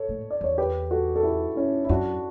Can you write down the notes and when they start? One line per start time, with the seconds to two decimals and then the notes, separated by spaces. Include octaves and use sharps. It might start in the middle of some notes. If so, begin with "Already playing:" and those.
Already playing: A4 C#5
0.09 A2
0.31 D5
0.41 E2 C#5
0.58 G4 B4
0.91 F#4 A4
1.16 A4
1.23 E4 G4
1.56 C#4 E4
1.85 E4
1.89 F#2 D4 F#4